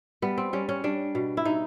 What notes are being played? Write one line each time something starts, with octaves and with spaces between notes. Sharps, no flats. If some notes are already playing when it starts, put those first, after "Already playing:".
G3 B3
C4
G3 C#4
C#4
G3 D4
B2
E4
B2 D#4